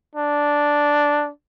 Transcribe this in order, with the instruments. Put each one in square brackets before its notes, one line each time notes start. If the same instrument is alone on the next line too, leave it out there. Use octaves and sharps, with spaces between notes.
[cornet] D4